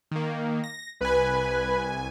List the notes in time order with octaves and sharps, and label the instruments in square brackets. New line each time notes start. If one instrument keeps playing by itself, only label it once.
[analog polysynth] D#3 A#3
A#6
[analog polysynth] C2 G#5 [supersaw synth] B4